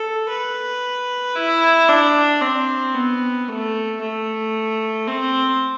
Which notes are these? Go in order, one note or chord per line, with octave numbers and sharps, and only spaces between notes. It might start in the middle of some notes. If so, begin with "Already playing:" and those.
Already playing: A4
B4
E4
D4
C4
B3
A3
A3
C4